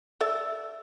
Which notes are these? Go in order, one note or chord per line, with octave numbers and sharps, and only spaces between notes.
A4 D5 E5